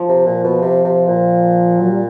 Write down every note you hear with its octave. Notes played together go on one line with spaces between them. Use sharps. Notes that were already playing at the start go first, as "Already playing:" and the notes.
Already playing: F3
C3
A#2
B2
C3
C3
A#2
F#3
G3